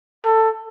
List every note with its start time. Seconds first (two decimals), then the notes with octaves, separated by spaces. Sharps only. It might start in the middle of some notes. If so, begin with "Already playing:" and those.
0.25 A4